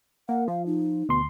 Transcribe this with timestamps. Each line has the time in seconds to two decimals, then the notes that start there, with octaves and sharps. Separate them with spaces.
0.29 A#3 F#5
0.48 F3 F5
0.66 D#4
1.09 D2 B2 C6